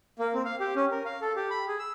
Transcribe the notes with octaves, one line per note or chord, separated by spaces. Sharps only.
A#3
C4
F5
G4
C#4
A#4
F5
A4
G4
B5
G#4
E6